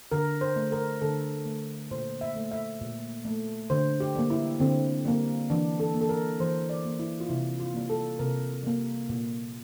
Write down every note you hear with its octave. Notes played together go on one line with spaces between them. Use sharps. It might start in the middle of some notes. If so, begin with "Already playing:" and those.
D3 A#4
C5
A3
A#4
D3 A4
A3
A#2 C5
E5
A3
E5
A#2
A3
D3 C5
G4
G3 A#3
E4
D3 C4
G3 A#3
E3 D4
A4
A#3
A4
A#4
E3 C5
D5
A#3
E4
F4
C3 E4
F4
G3 A#3
A4
C3 A#4
G3 A#3
A#2